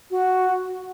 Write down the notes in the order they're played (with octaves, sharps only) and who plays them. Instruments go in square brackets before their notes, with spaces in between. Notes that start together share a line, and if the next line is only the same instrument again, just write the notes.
[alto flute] F#4